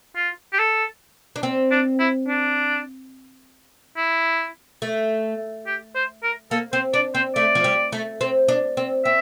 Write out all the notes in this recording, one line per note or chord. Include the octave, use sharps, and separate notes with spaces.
F4
G4
A4
D4
C4
D4
E4
D4
E4
A3
G4
C5
A#4
A#3 A4
C4 C5
D4 D5
C4 C5
A3 D5
F3
G3
A3
C4
D4
C4
C4 E5